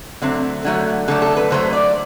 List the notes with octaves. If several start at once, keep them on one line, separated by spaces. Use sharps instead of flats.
D3 F#3 A3 C4
D3 F#3 A3
D3 F#3 A3 A4
A4
B4
D3 F#3 A3 C5
D5